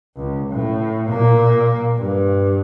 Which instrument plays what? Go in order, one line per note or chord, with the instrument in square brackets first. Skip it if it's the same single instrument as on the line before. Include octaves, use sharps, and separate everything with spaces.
[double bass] C#2
A2
A#2 A#3
G2